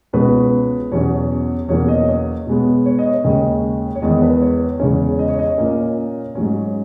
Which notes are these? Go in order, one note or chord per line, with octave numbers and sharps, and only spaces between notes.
C#2 B2 G#3 C#4 B4
E2 B2 F#3 C#4 C#5
E2 B2 F#3 A#3 C#4 C#5
D#5
C#5
B2 G#3 B3
C#5
D#5
C#5
D#2 C#3 G#3 C#4 D#5
C#5
E2 D#3 G#3 B3 D#5
B4
C#5
E2 C#3 G#3 C#4
D#5
C#5
D#5
A#2 A#3 C#4
G#2 F#3 C#4